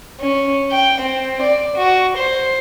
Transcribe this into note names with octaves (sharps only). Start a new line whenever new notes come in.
C#4
G5
C4
D5
F#4
C5